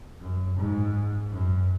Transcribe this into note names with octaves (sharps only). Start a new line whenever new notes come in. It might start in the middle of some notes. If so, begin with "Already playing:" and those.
F#2
G#2
F#2